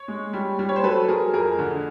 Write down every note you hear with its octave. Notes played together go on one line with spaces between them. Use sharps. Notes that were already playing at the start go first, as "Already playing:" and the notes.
Already playing: C#5
G#3
G3
G3
C#5
C5
F#3 A4 B4
F#3 G#4 A#4
F2 G#4 A#4
D3